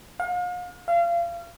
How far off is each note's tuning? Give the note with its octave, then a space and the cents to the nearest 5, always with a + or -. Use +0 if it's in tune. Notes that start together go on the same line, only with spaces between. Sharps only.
F5 +40
F5 -30